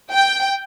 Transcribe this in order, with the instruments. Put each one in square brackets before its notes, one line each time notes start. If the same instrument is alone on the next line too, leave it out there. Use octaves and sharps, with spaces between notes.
[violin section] G5